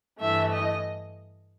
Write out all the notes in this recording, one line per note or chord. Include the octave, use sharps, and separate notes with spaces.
G2 E3 A3 E5
D#5